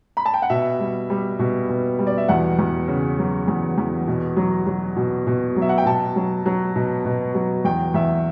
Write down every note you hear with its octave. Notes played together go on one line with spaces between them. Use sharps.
B5
A5
G5
F#5
B2 E5
G3
G3
B2
B2
G3
D5
E5
E2 F#5
E2
C#3
F#3
E2
E2
B2
F#3
F#3
B2
B2
F#3
E5
F#5
G5
B2 A5
F#3
F#3
B2
B2
F#3
E2 G5
E2 E5